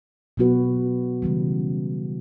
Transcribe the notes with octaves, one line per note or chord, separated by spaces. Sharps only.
B2 F#3 B3 F#4 B4
C#3 E3 G3